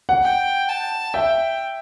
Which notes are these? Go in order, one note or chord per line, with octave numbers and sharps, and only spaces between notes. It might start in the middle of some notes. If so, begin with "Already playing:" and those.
F#5
G5
A5
E5 G5